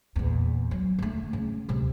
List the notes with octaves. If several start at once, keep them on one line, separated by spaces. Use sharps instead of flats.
E2 A#2
F#3
D3 A3
C#3
D2 C3